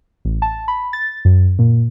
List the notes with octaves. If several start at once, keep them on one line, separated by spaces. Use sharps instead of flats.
A1
A5
B5
A6
F#2
A#2